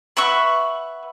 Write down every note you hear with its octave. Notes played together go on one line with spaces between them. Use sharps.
B4 E5 F#5 C#6